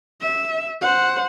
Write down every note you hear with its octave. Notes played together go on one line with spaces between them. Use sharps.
E5
C5 F#5